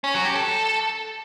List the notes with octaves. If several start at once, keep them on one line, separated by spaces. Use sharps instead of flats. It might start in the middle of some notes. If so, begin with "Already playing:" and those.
C#4
F#3
G4
A4